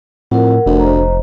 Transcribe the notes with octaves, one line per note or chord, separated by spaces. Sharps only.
F2 A2 A#4 F#5
F1 D2
C5 D#5 A#5